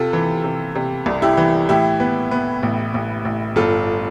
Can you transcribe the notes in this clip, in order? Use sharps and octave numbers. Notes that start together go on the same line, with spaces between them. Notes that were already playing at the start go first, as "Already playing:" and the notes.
Already playing: C3 F4 A4
E3
C3
C3
C2
E4 G4
E3
A2 E4 G4
B3
B3
A1
A1
A1
G1 F4 A4